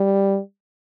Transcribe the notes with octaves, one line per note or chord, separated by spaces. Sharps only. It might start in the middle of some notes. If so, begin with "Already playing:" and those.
Already playing: G3